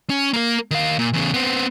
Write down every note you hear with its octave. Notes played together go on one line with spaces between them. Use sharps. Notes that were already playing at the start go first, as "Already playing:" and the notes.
C#4
A#3 A#4
D#3 F5
A#2
E2 C#3
B3 C4